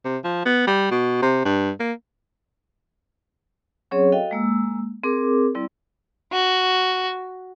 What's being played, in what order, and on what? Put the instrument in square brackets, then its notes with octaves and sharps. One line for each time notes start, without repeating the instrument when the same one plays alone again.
[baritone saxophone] C3
F3
B3
G3
B2
C3
G2
A#3
[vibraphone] F#3 C4 C#4 G#4 C#5
F#4 A4 D#5 F5 G5
G#3 A#3 E6
C4 G#4 A#4 D6
G3 C4 E4 D5
[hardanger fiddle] F#4